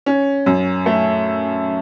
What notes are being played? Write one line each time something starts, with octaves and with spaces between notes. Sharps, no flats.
C#4
F#2
A3